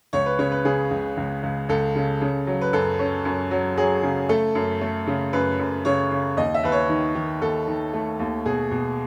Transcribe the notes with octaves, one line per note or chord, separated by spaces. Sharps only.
C#2 C#5
B4
C#3 C#5
B4
C#3 G#4
C#2
C#2
C#2
C#2 A4
C#3
C#3
F#3
B4
F#2 A4
C#4
F#2
F#3
F#3 G#4
C#3
A3 A4
F#2
A3
C#3
F#2 B4
F#2
C#3 C#5
C#3
D#2 D#5
E5
D#2 B4
C#5
D#3
D#3
D#2 A4
D#3
A3
D#2
B2 G#4
B2